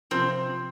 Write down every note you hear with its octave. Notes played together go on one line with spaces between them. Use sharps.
C3 F3 C4